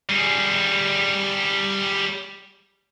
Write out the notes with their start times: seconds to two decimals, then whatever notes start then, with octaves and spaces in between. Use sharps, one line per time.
0.09 G3 G#4